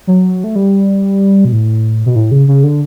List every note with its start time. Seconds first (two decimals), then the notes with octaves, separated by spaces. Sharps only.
0.07 F#3
0.44 A3
0.56 G3
1.45 B2
1.52 A2
2.06 B2
2.16 A2
2.31 C#3
2.48 C#3
2.64 D3